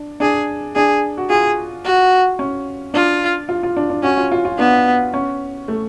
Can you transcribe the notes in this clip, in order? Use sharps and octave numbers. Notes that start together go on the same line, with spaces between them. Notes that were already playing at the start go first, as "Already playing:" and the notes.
Already playing: D4
D4 G#4
D4 G#4
F#4
F4 G#4
F#4
C#4
D4 F4
F4
F4
D4
D4
C#4 F#4
F4
F4
F4
B3 D4
C#4
A3